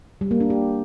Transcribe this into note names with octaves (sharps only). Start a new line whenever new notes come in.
G3
A#3
D4
G4